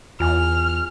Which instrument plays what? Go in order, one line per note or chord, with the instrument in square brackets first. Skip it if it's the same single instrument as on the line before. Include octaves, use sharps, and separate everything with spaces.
[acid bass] E2 [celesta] F4 G#5 [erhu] F6